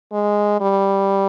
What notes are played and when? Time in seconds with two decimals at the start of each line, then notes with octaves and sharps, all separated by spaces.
0.13 G#3
0.61 G3